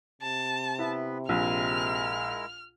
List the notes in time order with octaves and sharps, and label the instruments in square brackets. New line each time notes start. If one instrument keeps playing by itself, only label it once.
[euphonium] C3 [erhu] A5
[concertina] B3 B4 [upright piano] E4
[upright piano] A#1 [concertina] G#3 E4 A#4 [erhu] F6